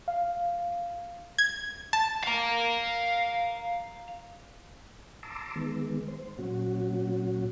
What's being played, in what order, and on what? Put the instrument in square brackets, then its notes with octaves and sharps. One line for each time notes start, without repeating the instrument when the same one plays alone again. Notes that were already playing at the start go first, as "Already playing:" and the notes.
[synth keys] F5
[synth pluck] G#6
A5
[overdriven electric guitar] F5 A#5
[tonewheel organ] A5 A#5 C6 D6 E6
D#3 G#3 B3
C5
A#2 F#3 C#4 F#4